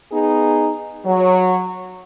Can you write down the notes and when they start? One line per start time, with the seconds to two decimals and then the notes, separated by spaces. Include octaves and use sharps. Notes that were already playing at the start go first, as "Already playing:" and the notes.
0.12 B3 D#4 G#4
1.06 F#3